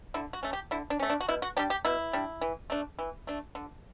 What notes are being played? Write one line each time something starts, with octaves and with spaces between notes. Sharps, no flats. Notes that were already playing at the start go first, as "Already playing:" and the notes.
D3 E4
F#4
A3 C#4
G4
D3 E4
D4
A3 C#4
D4
F#4
B2 E4
F#4
G3 D4 G4
G4
B2 E4
G3 D4
E3
A3 D4
E3
A3 D4
D3